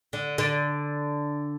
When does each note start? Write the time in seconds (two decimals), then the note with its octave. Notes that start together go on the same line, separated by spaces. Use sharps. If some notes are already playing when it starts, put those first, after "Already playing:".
0.13 D3
0.38 D3